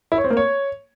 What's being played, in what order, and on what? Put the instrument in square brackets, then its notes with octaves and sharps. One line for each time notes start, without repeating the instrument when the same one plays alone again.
[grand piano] E4
C#5
C4
A#3
C#5